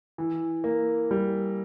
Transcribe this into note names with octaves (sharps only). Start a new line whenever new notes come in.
E3
A#3
G3